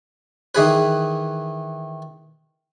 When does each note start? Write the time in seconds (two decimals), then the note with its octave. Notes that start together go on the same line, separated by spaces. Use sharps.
0.55 D#3 E3 G#4 B4